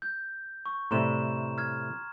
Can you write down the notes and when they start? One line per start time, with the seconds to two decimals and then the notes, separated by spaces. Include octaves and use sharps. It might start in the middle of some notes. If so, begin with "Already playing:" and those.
0.02 G6
0.66 C#6
0.91 A2 C3 G3 A#5 C6 E7
1.58 F6 G#6